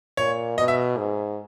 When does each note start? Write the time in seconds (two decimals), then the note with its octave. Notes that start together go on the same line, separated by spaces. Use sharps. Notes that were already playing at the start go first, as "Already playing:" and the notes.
0.17 A#2 C#5
0.57 B2 D#5
0.68 E5
0.98 G#2